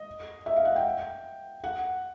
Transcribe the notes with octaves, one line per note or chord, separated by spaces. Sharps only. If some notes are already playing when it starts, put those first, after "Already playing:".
Already playing: D#5
E5
F5
F#5
G5
F#5